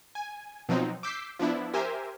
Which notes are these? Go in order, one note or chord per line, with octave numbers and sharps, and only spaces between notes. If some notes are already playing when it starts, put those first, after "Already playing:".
G#5
B2 F3 F#3 C4 D#4
D6 E6 G6 B6 C7
F3 B3 D4 E4
G4 A#4 C5 E5 G#5